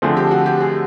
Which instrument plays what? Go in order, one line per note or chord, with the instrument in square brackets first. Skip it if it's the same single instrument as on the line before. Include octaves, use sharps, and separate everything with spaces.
[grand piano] D3 F3 A3 C4 [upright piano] G#4
[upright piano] G4
F#4
G4
G#4